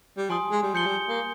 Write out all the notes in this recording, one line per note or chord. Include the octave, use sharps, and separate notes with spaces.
G3
F3 G#5 C6 D#6
G#3
G3
F3 G6 C#7 G7
G3
A#3